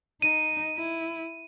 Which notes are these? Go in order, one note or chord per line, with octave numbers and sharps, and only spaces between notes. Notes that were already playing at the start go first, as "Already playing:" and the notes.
D#4 D#7
E4